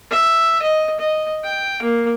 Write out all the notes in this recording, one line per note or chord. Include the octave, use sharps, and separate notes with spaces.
E5
D#5
D#5
G5
A#3